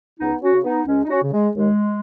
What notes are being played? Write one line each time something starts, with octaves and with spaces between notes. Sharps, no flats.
C#2 B3 D#4
C#4 F#4
C#3
B3 D#4
C#2 G#3 C#4
D#4
C#4 F#4
C#3
G#3
D#2 G#3